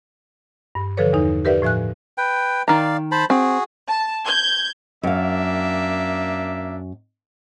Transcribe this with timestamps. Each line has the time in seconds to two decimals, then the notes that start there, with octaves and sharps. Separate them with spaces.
0.75 G2
0.97 D3 E3 F3 A4 B4 C#5
1.13 E2 D#4
1.45 G4 A#4 B4 D5 E5 F#5
1.62 A2 F3 E5 G#5 F#6
2.18 B4 G5
2.68 D#3 D5 F5 A#5
3.12 C5 A5 B5
3.30 C4 F#4 G#4
3.88 A5
4.27 G6 G#6
5.03 F#2 A#3 D4 E5 F5